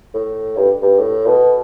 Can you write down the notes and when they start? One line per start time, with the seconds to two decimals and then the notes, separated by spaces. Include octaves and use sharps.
0.14 A2
0.56 G2
0.82 G2
0.99 A2
1.27 B2